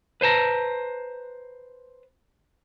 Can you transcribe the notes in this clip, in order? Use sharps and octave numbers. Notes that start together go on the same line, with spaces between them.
B4 C5 A5 A#5